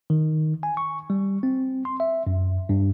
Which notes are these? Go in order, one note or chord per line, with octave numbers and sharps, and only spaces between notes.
D#3
G#5
C#6
G3
C4
C6
E5
F#2
G2